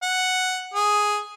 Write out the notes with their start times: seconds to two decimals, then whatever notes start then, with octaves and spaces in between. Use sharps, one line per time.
0.03 F#5
0.74 G#4